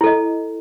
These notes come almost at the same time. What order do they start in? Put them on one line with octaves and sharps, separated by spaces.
E4 A4 D#5